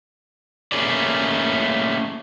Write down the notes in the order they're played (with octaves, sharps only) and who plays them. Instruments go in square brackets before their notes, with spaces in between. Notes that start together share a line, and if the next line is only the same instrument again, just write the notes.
[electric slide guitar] A3 A#3 C#4 G#4 B4 D5